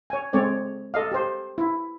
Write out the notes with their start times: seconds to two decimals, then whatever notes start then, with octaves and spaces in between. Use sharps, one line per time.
0.10 C#5 G#5
0.33 G#3 C4 A4 C#5 D5
0.94 A4 D#5 F5
1.12 G4 C5
1.58 E4